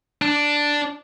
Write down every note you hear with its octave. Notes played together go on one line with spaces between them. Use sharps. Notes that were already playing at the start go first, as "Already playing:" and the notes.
D4